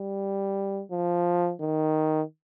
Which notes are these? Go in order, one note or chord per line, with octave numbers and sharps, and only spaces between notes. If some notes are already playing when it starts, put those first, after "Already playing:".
Already playing: G3
F3
D#3